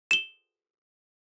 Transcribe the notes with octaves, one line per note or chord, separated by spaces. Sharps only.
E7 G7